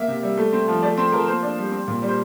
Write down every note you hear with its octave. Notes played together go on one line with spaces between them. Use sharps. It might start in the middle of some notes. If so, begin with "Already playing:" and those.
Already playing: A#3 E5
C3
G3
A3
C4
F3
A3 D5
C4 C5
F3 A#4
A#3 C5
D4
G3
C4
A#2
G3
C5